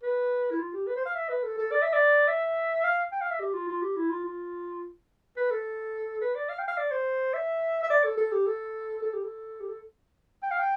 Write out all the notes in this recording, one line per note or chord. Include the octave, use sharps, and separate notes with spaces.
B4
E4
F4
G4
B4
C5
F5
E5
B4
A4
A4
D5
E5
D5
E5
F5
G5
F5
E5
G4
F4
F4
G4
E4
F4
F4
B4
A4
B4
D5
F5
G5
F5
D5
C5
E5
E5
D5
A4
A4
G4
A4
A4
G4
A4
G4
A4
G5
F5
G5